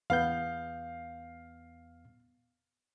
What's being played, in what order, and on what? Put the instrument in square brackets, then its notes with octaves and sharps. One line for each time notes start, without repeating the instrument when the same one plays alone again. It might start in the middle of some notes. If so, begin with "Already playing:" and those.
[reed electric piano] E2 B3 G6 [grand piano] F5